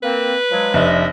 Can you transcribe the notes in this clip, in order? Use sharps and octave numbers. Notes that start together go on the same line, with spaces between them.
A#3 C4 B4
F3 F#3 G#3
F1 D4 D#5 E5